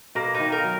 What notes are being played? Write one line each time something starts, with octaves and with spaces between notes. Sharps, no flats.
B2 A#3
D#4
D#3
A#4
F#3